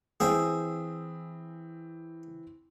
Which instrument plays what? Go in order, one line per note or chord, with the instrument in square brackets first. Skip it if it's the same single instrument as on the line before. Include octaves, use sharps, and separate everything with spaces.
[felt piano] E3 C4 [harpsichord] G#4 E5 G5